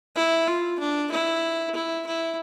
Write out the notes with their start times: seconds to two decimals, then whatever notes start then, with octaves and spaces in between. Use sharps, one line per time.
0.16 E4
0.47 F4
0.79 D4
1.12 E4
1.75 E4
2.06 E4